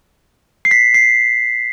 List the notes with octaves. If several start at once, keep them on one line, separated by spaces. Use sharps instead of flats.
C7
B6
C7